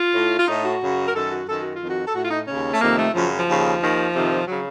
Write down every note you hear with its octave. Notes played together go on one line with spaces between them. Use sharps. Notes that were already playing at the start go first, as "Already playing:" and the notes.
Already playing: F4
A2
F4
A2 D#4
F#4
F#2 C#3
A#4
F#2 D#3 A4
F#4
F#2 D#3 A4
F#4
F4
F2 D#3
F#4
A4
A2 F#4
F4
D#4
D#2 C#3 C#4
A3
F2 C3 D#3 A#3
A3
F#2 C#3 F3
F3
D#2 C#3
D#2 D#3
F2 C3 D#3
C#3 F#3